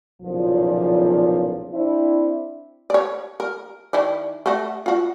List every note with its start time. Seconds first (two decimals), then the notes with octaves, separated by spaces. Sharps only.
0.22 B1 E2 A#2 C#3 F3
1.73 C4 D4 E4
2.90 C#5 D5
3.40 A#4
3.93 D#3 E4 D5
4.46 A3 F#4
4.86 F4 F#4